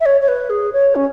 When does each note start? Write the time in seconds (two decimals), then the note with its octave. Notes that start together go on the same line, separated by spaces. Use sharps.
0.01 E5
0.06 C#5
0.21 C#5
0.28 B4
0.50 G#4
0.73 C#5
0.95 C#4